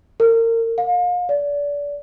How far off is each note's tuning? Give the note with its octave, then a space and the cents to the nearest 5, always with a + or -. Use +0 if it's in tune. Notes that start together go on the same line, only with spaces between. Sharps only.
A#4 -30
F5 +35
D5 -30